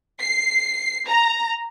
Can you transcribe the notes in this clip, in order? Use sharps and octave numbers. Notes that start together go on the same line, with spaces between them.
C7
A#5